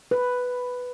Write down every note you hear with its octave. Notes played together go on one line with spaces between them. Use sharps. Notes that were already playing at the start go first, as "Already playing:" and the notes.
B4